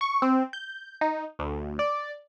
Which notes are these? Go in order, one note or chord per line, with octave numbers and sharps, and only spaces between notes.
C#6
C4
G6
D#4
D2
D5